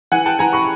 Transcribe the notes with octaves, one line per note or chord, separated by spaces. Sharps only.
E3 F#5 G#5
G5 A5
E3 G#5 A#5
B5 C#6